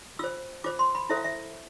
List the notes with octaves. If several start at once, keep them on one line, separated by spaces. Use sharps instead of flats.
F4 C5 E6
F4 C5 D6
C6
B5
E4 A4 C5 E5
F5
E5